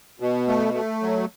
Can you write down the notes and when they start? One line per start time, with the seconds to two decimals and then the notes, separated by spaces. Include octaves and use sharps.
0.20 B2
0.48 A3
0.74 A3
1.02 F#3